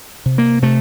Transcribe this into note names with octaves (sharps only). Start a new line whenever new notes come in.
C3
A#3
C3 A3